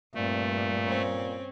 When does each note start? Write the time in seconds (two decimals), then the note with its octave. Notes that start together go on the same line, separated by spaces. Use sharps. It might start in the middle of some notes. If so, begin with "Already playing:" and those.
0.15 G2 A#2 A3 C4
0.84 C4 C#4